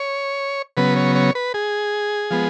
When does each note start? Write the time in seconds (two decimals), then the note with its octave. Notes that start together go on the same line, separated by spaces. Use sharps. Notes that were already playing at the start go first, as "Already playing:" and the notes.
Already playing: C#5
0.77 C#3 F#3 B3 B4
0.96 C#5
1.16 C#5
1.35 B4
1.54 G#4
2.31 F3 G#3 B3